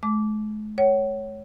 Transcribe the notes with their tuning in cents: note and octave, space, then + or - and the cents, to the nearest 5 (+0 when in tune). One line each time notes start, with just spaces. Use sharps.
G#3 +45 D6 -15
C#5 +0 F#5 +40